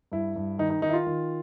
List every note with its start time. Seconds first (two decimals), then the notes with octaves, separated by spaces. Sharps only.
0.12 G2 E4
0.36 G2
0.58 D#3 D#4
0.70 D#4
0.82 D#3 D#4
0.89 E4
0.93 F4
1.06 D#3